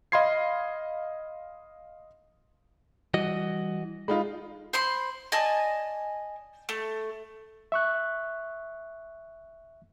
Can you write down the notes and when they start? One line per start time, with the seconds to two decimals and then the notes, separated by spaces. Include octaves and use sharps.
0.12 D#5 F5 B5 C6 G#6 C7
3.14 E3 G3 F#4 D#5
4.08 G#3 D#4 F4 B5
4.73 C5 B5 C6
5.32 D5 D#5 G#5 A5
6.69 A3
7.72 E5 C#6 F#6